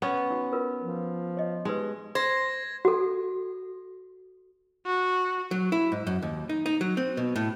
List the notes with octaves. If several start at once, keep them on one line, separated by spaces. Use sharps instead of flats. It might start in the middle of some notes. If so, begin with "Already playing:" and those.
B3 C#4
D#4 F#4
F4 A#4 B4
F3
C#5 D#5
G#3 D#4 G4 B4
C5 G#6 A#6
F#4 A4
F#4
F#3
E4
G#2
F#2
D#2
D#4
D#4
F#3
C4
B2
A2